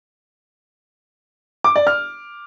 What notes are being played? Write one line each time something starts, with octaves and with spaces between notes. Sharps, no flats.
D6
D5
F6